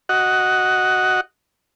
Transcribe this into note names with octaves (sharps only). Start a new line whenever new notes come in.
F#4 D#5 F#5